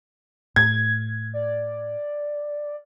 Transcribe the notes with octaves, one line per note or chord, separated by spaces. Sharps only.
A2 G#6
D5